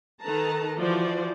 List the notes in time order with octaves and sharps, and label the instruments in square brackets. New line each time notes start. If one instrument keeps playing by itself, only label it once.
[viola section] D#3 A4 B4 A5 A#5
E3 F3 F#4 C5 D5